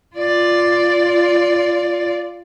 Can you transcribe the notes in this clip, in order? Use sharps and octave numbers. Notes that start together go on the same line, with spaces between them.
F4 D5